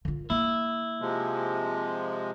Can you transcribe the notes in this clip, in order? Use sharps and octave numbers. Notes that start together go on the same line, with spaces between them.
D3 F4
A#3 E4
C3 F3 G#3